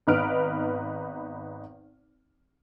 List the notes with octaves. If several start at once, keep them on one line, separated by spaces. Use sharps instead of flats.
G#1 B3 D#4 B4 F6 D7